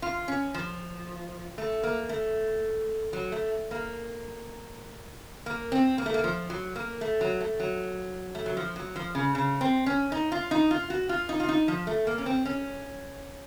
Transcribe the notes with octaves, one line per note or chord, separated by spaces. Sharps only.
F4
C#4
F3
A3
A#3
A3
F#3
A3
A#3
A#3
C4
A#3
A3
A#3
F3
F#3
A#3
A3
F#3
A3
F#3
A3
F#3
F3
F#3
F3
C#3
C#3
C4
C#4
D#4
F4
D#4
F4
F#4
F4
D#4
F4
D#4
F3
A3
A#3
C#4
C4
C#4